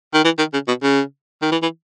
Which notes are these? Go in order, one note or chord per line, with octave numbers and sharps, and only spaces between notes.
D#3
E3
D#3
C#3
B2
C#3
D#3
E3
E3